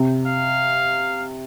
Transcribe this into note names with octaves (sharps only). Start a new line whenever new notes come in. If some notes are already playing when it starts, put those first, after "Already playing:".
Already playing: C3
F5